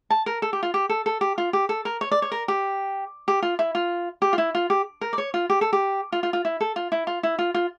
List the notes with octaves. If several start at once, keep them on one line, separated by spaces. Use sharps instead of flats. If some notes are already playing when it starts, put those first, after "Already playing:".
A5
A#4
A4
G4
F4
G4
A4
A4
G4
F4
G4
A4
A#4
C#5
D5
C#5
A#4
G4
G4
F4
E4
F4
G4
F4
E4
F4
G4
A#4
D5
C#5
F4
G4
A4
G4
F4
F4
F4
E4
A4
F4
E4
F4
E4
F4
F4